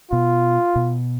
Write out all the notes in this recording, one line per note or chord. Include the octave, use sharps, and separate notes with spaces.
B2 F4
B2